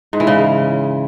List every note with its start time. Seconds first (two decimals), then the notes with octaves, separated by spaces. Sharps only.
0.13 G#2
0.20 E3
0.27 C#3